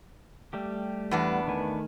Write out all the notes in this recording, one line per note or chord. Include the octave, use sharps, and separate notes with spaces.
G3 A3 G4
E2 B3 D4
D#3 A3 G#5